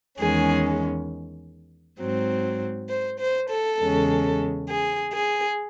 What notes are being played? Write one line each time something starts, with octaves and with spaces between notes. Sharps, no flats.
E2 D#3 G#3 C#4 G#4
G#2 F#3 C4
C5
C5
A4
E2 C#3 G#3 C#4
G#4
G#4